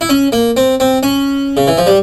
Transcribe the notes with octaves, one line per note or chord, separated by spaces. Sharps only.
E4
C#4
A#3
C4
C4
C#4
C#3
E3
F3
G3